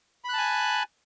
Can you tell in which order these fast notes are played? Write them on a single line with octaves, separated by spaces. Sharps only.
B5 F#6 A5 G#5